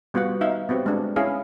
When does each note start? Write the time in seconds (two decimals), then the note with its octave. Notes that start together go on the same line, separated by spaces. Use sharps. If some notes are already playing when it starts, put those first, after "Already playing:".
0.14 G3 B3 F4 F#4 F#5
0.41 D#4 E5 F5
0.69 B3 C4 F#4 G4
0.86 G#3 D4
1.16 C#4 E4 G#4 F5